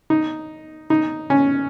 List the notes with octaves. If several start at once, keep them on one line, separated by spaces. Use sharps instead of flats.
D#4
D#4
C#4